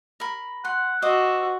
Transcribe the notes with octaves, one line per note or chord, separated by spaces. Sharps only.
A#4 B5
F#5 C6
F#4 C5 D#5 D6 E6